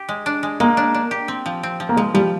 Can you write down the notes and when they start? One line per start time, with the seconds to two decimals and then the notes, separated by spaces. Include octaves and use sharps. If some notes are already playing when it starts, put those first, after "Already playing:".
Already playing: G4
0.09 G#3
0.26 D4
0.43 G#3
0.60 G#3 A#3
0.77 D4
0.94 D4
1.11 G4
1.28 C4
1.46 F3
1.63 C4
1.80 F3
1.89 A#3
1.97 F3 G#3
2.14 F3 G3